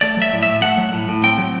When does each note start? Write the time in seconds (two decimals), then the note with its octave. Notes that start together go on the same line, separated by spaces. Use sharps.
0.01 A3 D5
0.17 F#3 E5
0.33 A2
0.43 E5
0.47 A2
0.62 A3 F#5
0.78 F#3
0.93 A2
1.08 A2
1.24 C4 G5
1.38 F#3